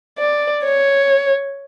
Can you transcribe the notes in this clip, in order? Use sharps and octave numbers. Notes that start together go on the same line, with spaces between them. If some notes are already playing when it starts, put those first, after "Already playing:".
D5
C#5